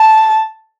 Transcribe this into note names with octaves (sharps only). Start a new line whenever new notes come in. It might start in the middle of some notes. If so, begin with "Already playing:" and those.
Already playing: A5